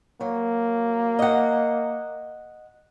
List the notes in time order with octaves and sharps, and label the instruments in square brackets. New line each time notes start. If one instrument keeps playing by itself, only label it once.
[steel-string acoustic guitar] F#3 [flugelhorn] A#3
[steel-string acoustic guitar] D#5 F#5